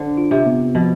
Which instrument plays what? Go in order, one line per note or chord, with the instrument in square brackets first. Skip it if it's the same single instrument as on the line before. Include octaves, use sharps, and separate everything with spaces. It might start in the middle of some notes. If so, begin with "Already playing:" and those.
Already playing: [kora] D3 [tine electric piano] C5
[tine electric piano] F4
[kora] C3
[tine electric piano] B3
[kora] B2 [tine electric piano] F3